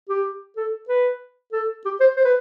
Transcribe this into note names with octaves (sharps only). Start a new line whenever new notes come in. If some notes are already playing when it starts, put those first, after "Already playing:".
G4
A4
B4
A4
G4
C5
C5
B4